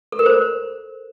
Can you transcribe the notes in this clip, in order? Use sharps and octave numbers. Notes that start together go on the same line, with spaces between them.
A4
A#4
C5